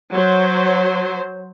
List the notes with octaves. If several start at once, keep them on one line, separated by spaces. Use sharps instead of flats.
F#3 C5